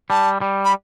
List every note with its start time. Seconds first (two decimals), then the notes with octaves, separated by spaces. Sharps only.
0.10 G3 A5
0.41 G3
0.65 B5